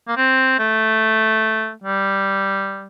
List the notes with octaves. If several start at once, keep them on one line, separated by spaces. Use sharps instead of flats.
A#3
C4
A3
G3